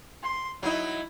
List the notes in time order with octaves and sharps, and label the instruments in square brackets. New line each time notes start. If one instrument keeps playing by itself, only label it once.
[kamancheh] C6
[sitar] F#3 D#4 [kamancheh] E4